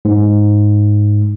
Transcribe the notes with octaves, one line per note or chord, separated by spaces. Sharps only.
G#2